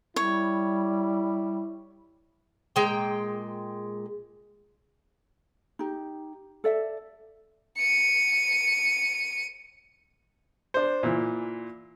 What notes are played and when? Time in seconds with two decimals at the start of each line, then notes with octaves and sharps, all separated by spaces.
0.16 G3 E4 C#5
2.76 A#2 G#3 G5
5.79 D#4 G4
6.64 A4 D5 E5
7.77 C#7 D#7
10.74 D4 C5
11.03 A#2 E3